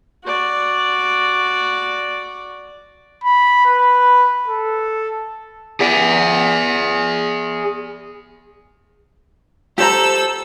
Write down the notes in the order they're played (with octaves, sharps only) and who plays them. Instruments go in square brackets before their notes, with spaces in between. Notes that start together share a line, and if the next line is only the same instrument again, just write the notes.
[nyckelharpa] F#4 D5
[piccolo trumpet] B5
B4
A4
[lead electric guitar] G#4 D5
[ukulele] G4 C5 A#5 [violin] A4 E6